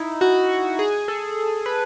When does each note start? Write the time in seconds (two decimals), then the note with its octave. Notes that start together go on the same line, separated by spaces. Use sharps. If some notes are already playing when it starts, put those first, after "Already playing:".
Already playing: D#4 E4
0.21 F#4
0.79 G#4
1.08 A4
1.66 B4